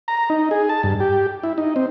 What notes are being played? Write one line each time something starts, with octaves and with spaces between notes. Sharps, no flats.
A#5
D#4
G#4
A5
G2
G4
E4
D#4
C4